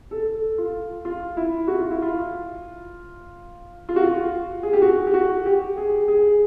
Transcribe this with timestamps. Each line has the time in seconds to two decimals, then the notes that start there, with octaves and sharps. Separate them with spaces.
0.11 A4
0.58 F4
1.05 F4
1.37 E4
1.68 F#4
1.80 F4
1.90 E4
2.02 F4
3.89 F4
3.96 F#4
4.04 F4
4.63 G#4
4.73 G4
4.82 F#4
5.07 G4
5.14 F#4
5.46 G4
5.77 G#4
6.08 G#4